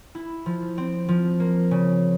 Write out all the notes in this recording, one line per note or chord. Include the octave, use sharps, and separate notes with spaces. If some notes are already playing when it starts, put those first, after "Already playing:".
E4
F3
C4
F3
A#3
C#3